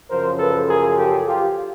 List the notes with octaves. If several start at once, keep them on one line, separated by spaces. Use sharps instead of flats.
F#2 C#3 F3 A#4 C5
A4 B4
G#4 A#4
G4 A4
F4 G4